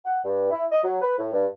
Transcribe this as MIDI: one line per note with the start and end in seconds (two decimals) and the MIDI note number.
0.05 0.19 78
0.24 0.49 43
0.50 0.64 64
0.71 0.82 75
0.83 0.98 54
1.02 1.15 71
1.18 1.29 45
1.33 1.46 43